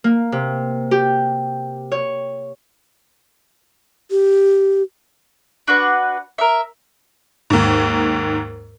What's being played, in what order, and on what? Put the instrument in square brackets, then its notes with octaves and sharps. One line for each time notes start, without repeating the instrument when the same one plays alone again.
[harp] A#3
C3
G4
C#5
[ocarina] G4
[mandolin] D4 F#4 B4
A#4 E5
[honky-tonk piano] D#2 G#2